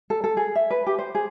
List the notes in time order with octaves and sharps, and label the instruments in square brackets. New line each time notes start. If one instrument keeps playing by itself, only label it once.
[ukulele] A4
A4
G#4
E5
B4
G4
C5
G#4